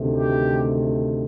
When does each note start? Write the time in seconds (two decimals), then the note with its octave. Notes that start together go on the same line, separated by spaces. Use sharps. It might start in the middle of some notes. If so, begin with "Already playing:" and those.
Already playing: D2 C3 D#3 A3
0.12 G4